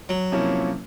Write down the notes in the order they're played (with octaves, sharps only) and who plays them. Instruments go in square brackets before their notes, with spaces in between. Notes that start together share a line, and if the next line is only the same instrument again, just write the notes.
[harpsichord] F#3
[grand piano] C3 F3 A#3 C#4 E4